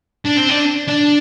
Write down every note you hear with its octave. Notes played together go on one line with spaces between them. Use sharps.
D4
C4
D4
D4